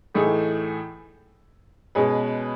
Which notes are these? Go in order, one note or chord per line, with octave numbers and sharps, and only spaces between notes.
A2 E3 A3 D#4 G#4
B2 G#3 C#4 G#4 B4